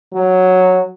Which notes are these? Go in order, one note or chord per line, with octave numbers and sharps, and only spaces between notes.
F#3